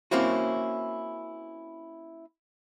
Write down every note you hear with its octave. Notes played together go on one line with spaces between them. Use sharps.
A#3 C4 C#4 E4 F#4